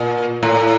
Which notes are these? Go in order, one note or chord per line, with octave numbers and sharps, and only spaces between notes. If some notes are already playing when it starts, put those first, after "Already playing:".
Already playing: A#2
A2